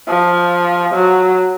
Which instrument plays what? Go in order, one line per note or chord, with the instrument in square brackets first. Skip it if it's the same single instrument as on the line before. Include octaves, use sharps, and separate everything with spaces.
[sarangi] F3
F#3